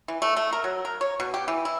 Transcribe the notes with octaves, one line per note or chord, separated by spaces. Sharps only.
E3
A3
A3
A#4
F#3
A#4
C#5
B2
G4
E3
E4